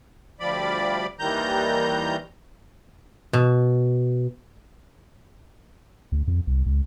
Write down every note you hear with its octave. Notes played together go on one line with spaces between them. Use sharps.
D2 F3 G3 D5 B5
D#2 D#3 E3 G3 A#5 G6
B2
D2
F2
C2
C#2